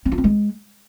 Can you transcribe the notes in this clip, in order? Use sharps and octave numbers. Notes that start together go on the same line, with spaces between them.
C4
F4
C4
G#3